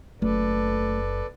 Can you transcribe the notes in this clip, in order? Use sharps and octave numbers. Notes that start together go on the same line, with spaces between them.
F#1 A3 A4 B4 D5